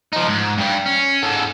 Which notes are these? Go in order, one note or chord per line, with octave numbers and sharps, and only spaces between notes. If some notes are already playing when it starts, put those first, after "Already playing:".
F3 D#4
G#2
G2 G3
C#4
G#2 A4